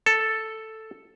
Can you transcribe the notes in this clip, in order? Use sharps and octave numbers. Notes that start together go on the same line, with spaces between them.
A4